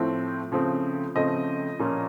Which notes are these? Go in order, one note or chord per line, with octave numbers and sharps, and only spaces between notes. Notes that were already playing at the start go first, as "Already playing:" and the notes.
Already playing: A2 F3 A3 C4
C#3 F3 A3 C4
C#3 F3 A3 C4 D#5
A#2 F3 A#3 C#4